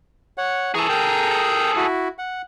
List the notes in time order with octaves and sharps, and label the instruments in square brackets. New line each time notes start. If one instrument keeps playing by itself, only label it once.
[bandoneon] C#5 F#5
[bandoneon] E3 A#5 C#6 [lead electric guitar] G#4 A4
[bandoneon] A#4 G5 A#5
E4 F#4
F#5